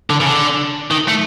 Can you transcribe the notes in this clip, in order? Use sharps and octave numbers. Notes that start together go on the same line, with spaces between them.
D3
C#3
D3
D#3
A3